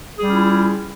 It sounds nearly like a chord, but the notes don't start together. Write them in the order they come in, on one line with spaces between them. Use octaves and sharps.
G#4 G3 C#4 F4 E4